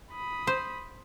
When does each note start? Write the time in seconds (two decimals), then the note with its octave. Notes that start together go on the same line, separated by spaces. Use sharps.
0.12 B5 D#6
0.47 C5